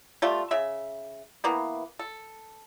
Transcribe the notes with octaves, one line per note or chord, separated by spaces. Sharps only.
G3 A3 F4
C#3 E5
E3 A#3 B3
A4